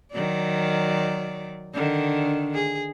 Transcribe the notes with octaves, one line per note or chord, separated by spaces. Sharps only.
D#3 F#3 D5
D3 D#3
G#4